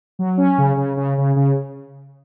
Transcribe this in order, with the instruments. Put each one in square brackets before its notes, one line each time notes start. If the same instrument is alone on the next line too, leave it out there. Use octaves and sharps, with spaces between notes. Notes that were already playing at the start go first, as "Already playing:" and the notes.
[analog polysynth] F#3
C#4
C#3
C#3
C#3
C#3
C#3